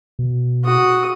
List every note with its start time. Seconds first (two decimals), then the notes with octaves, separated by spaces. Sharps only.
0.19 B2
0.65 F#4 D#6